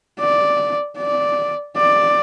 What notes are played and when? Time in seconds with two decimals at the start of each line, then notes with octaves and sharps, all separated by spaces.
0.20 D5
0.98 D5
1.77 D5